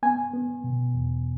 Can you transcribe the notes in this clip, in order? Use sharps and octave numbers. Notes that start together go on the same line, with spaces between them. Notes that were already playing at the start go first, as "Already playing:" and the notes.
B3 G#5
B3
B2
E2